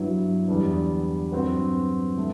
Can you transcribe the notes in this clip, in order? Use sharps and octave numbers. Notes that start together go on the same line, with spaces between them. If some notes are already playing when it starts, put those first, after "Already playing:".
Already playing: G2 F#3 B3 E4
E2 D3 G3 B3 D4
G2 F#3 C4 F#4 B4
D3 A3